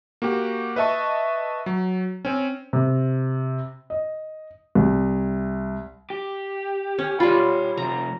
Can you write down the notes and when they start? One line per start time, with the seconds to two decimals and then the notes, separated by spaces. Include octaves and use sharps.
0.22 A#3 F#4 G4 G5
0.76 B4 D#5 E5 A5 C#6
1.66 F#3
2.25 C4 C#4
2.73 C3
3.90 D#5
4.75 C2
6.10 G4
6.99 C#4
7.20 G3 F4 C#5 B5
7.77 C3 F3 A#5